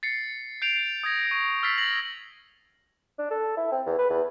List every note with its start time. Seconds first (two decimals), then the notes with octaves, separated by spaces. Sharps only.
0.03 A6 C7 C#7
0.62 G6 C7 D7 F7
1.03 D#6 G#6 A#6
1.31 C#6
1.63 E6 F6 A6 B6 C7
1.78 A#6 F#7
3.18 D4
3.31 A4
3.57 E4
3.72 C4
3.86 E2
3.98 B4
4.10 E2